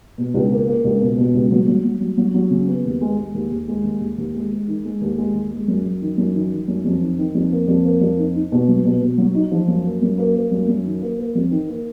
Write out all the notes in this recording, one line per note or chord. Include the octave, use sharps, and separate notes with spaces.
B2
C#2
A#3
A#3
C#2
B2
B2
C#2
F#3
F#3
F#3
F#3
F#3
F#3
C#3
B3
D#2
G#3
G#3
D#2
D#2
G#3
D#2
D#2
D#2
G#3
G#3
D#3
G#3
D#2
G#3
D#2
G#3
F#2
F#2
D#3
F#2
D#3
D#3
F#2
F2
D#3
D#3
F2
A#3
F2
A#3
F2
D#4
D#4
B2
F#3
B2
B2
F#3
D#4
F3
F#2
A#3
F#2
A#3
A#3
F#2
F#2
D#3
A#3
A#3
F2
D#3
A#3